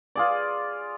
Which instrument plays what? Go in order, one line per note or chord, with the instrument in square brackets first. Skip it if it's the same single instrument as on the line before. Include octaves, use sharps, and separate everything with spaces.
[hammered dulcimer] F4 G#4 D5